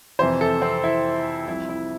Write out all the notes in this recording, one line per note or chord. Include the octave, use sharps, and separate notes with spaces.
F2 C3 E3 C5
A4
C4
E4
C2 C3 F3 E4
E4